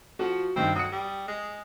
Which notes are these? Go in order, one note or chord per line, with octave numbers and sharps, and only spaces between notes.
F3 F#4 F#5
G2 D#3 C4
F#3 D#6 C#7
G3
G#3